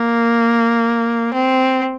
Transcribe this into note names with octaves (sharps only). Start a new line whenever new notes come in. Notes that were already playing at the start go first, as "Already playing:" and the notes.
Already playing: A#3
C4